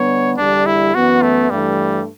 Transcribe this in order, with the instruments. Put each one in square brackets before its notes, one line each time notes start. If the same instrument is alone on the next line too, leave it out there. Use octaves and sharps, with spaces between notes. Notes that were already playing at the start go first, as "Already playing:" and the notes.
Already playing: [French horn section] D3 G3 B3 [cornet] C#5
[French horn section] E2 D3 G3 [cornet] D4
[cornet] E4
[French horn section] F#2 E3 B3 [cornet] F#4
[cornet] A3
[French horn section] G2 E3 A3 [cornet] G3